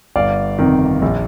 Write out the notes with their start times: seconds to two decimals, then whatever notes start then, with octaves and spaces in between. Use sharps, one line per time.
0.16 G1 D5 F5
0.59 F2 C3 D#3
1.02 A#1